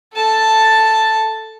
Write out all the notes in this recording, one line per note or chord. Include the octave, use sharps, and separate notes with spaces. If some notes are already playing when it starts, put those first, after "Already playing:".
A4 A5